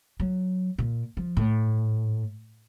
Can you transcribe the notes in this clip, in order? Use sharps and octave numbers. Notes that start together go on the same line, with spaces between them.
F#3
A#2
F3
A2